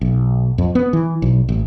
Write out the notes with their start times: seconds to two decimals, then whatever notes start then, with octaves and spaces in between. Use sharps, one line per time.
0.01 B1
0.58 F2
0.75 B3
0.93 E3
1.22 B1
1.49 A1